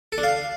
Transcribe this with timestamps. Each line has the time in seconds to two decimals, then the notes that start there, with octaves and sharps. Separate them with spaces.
0.12 A4
0.18 D4
0.23 F5